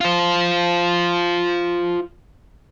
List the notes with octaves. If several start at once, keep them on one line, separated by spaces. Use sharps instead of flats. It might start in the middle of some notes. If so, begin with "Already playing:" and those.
F4 C5